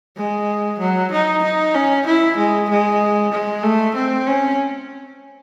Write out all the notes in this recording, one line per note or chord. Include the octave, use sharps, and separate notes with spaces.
G#3
F#3
D#4
D#4
C#4
E4
G#3
G#3
G#3
A3
C4
C#4